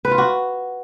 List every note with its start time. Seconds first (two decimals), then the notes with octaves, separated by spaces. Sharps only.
0.05 B4
0.11 F4
0.18 F#4